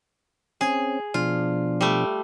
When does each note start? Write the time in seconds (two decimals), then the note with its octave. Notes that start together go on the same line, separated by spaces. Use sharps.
0.61 C4 C#4 G#4
1.14 B2 F3 D4 F4
1.81 G3 A3